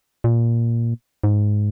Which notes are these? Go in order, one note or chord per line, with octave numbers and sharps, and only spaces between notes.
A#2
G#2